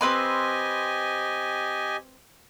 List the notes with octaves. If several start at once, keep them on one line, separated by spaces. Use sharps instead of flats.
C4 G4 B4 D#5 G#5 C6